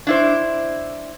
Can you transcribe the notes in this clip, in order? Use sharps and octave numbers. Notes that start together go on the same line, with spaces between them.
D4 E4 C5